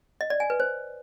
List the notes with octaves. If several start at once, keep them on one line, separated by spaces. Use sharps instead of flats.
D#5
D5
G#5
B4
C5